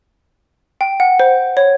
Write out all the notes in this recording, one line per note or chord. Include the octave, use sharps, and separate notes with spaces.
G5
F#5
C5
C#5